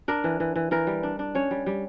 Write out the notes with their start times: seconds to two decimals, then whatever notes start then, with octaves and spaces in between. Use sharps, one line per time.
0.08 D4 A#4
0.24 E3
0.40 E3
0.56 E3
0.71 E3 A#4
0.87 G3
1.03 D4
1.19 D4
1.35 C#4 C#5
1.51 G3
1.66 G3